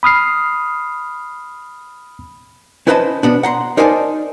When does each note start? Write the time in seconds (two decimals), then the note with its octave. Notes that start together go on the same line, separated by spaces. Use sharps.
0.03 B5 D#6 F6 C7
2.87 C#4 E4 B4 C5 D#5 A5
3.23 B2 B3 D4
3.43 F#5 A#5 C6
3.77 D#4 A#4 C5 D5 G#5 A5